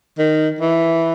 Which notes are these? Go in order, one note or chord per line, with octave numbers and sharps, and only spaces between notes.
D#3
E3